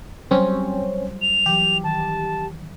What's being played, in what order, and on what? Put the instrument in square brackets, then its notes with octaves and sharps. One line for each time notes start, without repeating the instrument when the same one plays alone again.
[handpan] F#3 G3 C5 [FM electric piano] C4 C#4
[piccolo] F7
[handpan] E3 F#3 [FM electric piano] G4
[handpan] D#3 [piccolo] A5